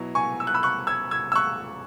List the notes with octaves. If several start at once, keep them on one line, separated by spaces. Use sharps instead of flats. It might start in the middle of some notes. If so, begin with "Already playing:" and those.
Already playing: B2 F#3 E4
G#5 C#6
E6
F#6
B5 E6
C#6 F#6
E6 G#6
E6 G#6
E6
C#6 F#6